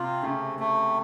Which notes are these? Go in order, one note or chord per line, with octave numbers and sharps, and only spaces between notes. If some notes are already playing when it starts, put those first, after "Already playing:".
Already playing: C3 F4
C#3 A3
A3